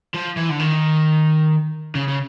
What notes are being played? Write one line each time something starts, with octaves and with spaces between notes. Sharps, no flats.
F3
E3
D3
D#3
C#3
C#3